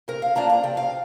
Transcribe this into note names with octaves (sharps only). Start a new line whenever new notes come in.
C3 A#4
F5
F3 A#3 D4 A#5
A#5
C3 G5
F5